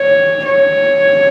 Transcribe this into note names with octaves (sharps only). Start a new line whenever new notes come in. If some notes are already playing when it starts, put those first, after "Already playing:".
Already playing: C#5
C#5